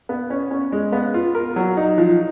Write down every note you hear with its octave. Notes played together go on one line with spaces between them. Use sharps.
B3
C#4
C#4
G#3
B3
F4
A#4
F#3
D#4
F3